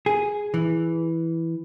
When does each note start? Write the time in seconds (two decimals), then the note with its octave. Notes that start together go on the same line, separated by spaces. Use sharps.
0.06 G#4
0.54 E3